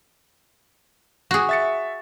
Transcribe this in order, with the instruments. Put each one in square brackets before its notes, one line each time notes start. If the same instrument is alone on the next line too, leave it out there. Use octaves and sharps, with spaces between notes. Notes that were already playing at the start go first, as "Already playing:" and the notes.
[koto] F#4 G#4
[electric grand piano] E5 A6 C#7